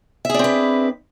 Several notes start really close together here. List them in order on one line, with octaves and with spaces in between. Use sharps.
E5 G#4 D4 C4 B4